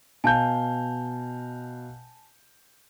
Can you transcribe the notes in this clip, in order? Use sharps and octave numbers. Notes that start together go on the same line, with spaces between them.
B2 F5 G#5 A5 G6